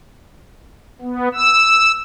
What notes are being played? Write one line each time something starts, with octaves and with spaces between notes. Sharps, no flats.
B3
E6